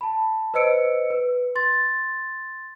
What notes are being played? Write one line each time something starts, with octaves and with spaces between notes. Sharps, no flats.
A5 B5
B4 C5 D#5 E6 C#7 D7
B4
C6 A6